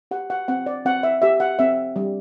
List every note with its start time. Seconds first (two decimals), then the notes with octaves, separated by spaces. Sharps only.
0.11 G4 F#5
0.30 F#5
0.48 C4 F#5
0.66 D5
0.85 C4 F#5
1.03 E5
1.22 G4 E5
1.40 F#5
1.59 C4 E5
1.96 G3